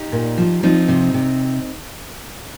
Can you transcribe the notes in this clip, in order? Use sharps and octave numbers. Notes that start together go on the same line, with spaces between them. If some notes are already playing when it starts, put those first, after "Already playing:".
Already playing: D#4 G4
A#2
F3
F3 C4 D#4
C3
C3